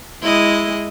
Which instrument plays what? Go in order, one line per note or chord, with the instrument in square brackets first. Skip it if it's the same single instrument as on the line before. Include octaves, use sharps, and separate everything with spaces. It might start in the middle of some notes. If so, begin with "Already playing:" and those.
[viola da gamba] G#3 E4 D#5